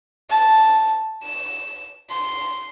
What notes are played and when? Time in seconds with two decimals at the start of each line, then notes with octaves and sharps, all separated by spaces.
0.30 A5
1.23 E7
2.10 C6